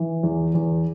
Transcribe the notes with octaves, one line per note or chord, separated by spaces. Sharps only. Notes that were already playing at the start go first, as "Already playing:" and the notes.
Already playing: E3
E2
E2